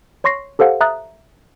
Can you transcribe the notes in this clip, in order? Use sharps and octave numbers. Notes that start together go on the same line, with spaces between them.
C#5 C6 C#6 A#6 C7
G4 A4 C5 F5 F#5
E5 A#5 D#6 F#6 A6